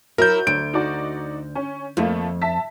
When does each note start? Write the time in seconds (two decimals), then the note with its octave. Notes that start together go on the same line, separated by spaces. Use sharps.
0.18 F#3 E4 A#4 G6
0.47 D2 D7
0.73 D#4 F#4 D5
1.55 C#4
1.97 F2 F3 A3 A#3
2.41 E5 A5 B6